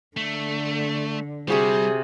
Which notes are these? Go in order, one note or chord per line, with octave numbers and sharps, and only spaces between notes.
D3 A3
C3 G3 F#4 G#4 C5